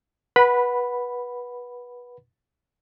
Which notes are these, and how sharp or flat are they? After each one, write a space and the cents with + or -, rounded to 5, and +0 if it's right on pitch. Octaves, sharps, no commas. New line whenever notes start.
B4 -20 F#5 +0 B5 +0